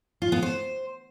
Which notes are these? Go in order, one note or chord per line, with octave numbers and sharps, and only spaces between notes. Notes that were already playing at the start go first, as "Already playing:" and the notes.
F4
B3
C5